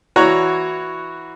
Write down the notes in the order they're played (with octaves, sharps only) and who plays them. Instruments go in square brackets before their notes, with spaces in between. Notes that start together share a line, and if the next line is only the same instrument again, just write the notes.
[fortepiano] E3 F#4 C#5 A#5 F#6